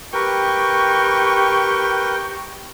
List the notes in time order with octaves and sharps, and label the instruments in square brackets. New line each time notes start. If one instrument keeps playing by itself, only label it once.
[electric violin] G4 C#6 [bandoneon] A#4 B4 [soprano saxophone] G5